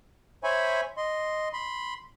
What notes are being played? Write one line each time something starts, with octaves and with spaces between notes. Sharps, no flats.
C5 C#5 E5 G#5 B5 C#6
D#5 C6
B5 C6